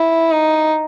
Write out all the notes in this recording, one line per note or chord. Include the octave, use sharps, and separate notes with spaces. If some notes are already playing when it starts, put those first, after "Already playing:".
Already playing: E4
D#4